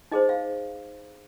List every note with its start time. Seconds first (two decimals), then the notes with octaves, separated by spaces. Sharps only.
0.11 D#4 G#4 C5 D#5
0.29 F5